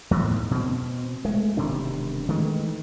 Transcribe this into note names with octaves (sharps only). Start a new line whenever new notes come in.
E2 A2 D#3
B2 C4
G#3 A3
E1 C3 D#3 D4
D#3 E3 G#3 A3